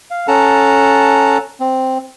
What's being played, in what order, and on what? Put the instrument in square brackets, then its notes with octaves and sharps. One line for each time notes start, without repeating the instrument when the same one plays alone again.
[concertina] F5
C#4 A4 F#5 A5 A#5
C4